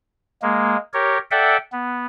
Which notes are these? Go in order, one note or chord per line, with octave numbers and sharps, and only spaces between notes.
G#3 A#3
G4 A#4 C#5
A4 D5 E5 F#5 G5
B3